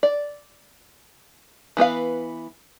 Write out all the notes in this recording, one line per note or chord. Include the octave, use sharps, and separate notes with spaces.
D5
E3 B3 B4 F5